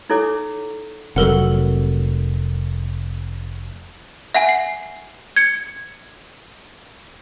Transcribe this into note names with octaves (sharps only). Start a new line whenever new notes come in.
D#4 E4 A4 C#5 D6
F1 F#3 A4 A#4 F#5
E5 F#5 G#5
C7
G#6 C#7